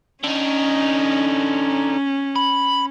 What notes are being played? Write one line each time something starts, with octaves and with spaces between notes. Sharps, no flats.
D3 C#4 D#4
B5